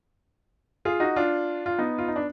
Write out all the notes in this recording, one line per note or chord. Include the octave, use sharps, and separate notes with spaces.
F4 G#4
D#4 F#4
D4 F4
F4
B3 D#4
F4
D#4
D4